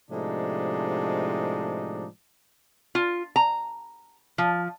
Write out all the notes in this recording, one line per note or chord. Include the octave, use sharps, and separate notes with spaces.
A2 C3 F3 G#3 D4 D#4
F4
A#5
F3